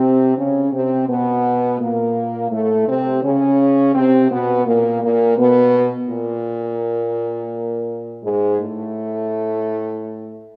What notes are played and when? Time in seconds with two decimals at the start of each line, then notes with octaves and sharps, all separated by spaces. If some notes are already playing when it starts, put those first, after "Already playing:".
Already playing: C3 C4
0.37 C#3 C#4
0.73 C3 C4
1.08 B2 B3
1.80 A#2 A#3
2.51 A2 A3
2.87 C3 C4
3.23 C#3 C#4
3.95 C3 C4
4.30 B2 B3
4.66 A#2 A#3
5.01 A#2 A#3
5.37 B2 B3
6.10 A#2 A#3
8.24 G#2 G#3
8.59 A2 A3